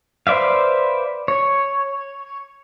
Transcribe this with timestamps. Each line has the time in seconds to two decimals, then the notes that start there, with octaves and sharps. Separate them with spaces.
0.27 B4 C5 D5 E5 F5
1.28 C#5